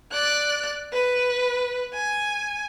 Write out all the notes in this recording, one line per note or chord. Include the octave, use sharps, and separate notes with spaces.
D5 F#6
B4
G#5